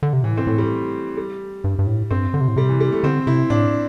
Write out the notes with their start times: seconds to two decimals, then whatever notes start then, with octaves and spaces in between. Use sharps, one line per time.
0.03 D3
0.13 C3
0.23 A2 E3
0.37 C4
0.47 A2 A3
0.58 G3
1.17 G3
1.64 G2
1.79 G2
1.87 A2
2.11 G2 C4
2.34 D3
2.41 C3
2.48 A2
2.56 C3 G3
2.69 E3
2.80 G3
2.92 A3
3.03 D3 C4
3.27 C3 E4
3.50 A2 D4